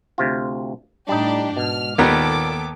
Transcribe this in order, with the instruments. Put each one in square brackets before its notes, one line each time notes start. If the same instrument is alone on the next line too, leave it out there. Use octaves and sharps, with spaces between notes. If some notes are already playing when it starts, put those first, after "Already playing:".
[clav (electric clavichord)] D2 C3 F4
[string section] A2 D4 G4 [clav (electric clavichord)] G3 D#4
[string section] G#2 F6 [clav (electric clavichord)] B2
[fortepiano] D#2 B3 [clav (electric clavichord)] A#2 [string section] D#3 A4 D6